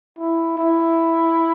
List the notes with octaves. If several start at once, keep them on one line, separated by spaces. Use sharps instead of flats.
E4
E4